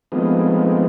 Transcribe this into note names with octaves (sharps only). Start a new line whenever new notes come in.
F3 G#3 A3 B3 C4 D#4